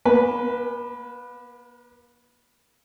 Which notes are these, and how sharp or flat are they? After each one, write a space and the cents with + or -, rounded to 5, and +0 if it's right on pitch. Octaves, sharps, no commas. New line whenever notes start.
A#3 +45 B4 +0